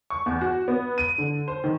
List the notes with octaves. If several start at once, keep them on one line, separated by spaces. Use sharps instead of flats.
C#6
E2
F#4
B3
D#7
D3
C5
D#3